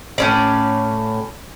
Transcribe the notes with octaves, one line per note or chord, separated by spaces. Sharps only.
A2 C#4 D5